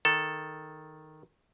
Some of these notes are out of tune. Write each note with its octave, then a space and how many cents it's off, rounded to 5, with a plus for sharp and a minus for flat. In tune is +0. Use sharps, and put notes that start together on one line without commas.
D#3 +0 A4 +0